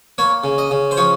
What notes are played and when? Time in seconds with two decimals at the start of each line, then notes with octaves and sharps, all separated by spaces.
0.18 A#3 C#5
0.44 C#3
0.58 D#5
0.71 C#3
0.91 C5
0.97 F3 C#5